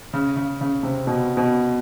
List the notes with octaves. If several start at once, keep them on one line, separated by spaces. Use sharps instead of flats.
C#3
C#3
C#3
C3
B2
B2